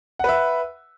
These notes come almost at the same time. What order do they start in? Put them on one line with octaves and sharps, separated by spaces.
F#5 B4 E5